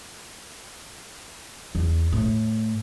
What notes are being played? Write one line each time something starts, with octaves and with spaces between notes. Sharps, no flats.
E2
A2